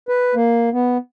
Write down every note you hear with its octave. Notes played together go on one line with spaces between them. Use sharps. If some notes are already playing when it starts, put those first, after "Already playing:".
B4
A#3
B3